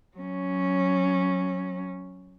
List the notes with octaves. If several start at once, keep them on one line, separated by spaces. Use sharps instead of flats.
F#3 C#4